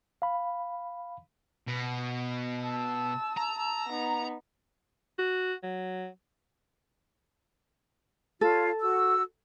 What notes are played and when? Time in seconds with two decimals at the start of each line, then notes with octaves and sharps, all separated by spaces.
0.22 F5 B5
1.67 B2
2.61 A5 E6
3.37 A#5
3.89 B3 D#4
5.19 F#4
5.63 F#3
8.41 F4 A4 C#5
8.80 F#4 E6